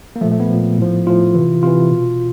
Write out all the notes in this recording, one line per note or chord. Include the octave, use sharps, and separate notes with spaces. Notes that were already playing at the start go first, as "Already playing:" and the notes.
A#3
A#2 F3 A3
A3
B3
A#2 F3
A2 F3
A2 F3 F4
C3 E3
C3 E3 F4
B2